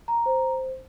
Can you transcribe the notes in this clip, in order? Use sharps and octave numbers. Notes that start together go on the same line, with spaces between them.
A#5
C5